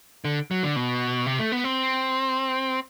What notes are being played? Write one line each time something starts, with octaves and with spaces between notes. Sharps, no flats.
D3
F#3
D3
B2
C3
A3
B3
C4